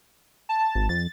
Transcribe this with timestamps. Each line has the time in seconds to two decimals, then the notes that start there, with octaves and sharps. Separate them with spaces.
0.49 A5
0.75 G#1
0.89 F2 A6